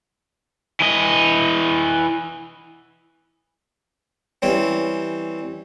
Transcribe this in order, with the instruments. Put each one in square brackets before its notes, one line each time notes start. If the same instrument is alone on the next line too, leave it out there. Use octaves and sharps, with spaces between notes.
[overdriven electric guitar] E3 D#5
[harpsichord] E3 G3 C4 C#4